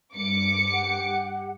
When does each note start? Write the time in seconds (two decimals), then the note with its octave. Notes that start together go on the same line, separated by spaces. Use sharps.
0.15 G2 D6 C#7
0.72 G4 F#5